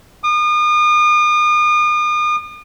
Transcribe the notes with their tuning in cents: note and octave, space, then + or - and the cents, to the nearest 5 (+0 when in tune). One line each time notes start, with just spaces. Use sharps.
D#6 -40